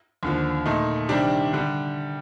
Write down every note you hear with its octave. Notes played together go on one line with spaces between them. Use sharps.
D#2 D3 F3
A#2 A3 D#4
C3 D#3 G3 D4 G4
D3 G3